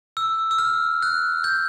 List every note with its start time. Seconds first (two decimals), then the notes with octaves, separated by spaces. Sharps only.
0.17 E6
0.51 E6
0.58 F6
1.02 F#6
1.44 G6